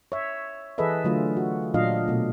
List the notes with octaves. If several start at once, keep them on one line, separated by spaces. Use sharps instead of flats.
C#5 E5
E3 G#4 A4 B4 D#5 E5
D3 F#3 A3 F4
F#4
A#2 F#3 D4 F4 D#5 F5
B2 A3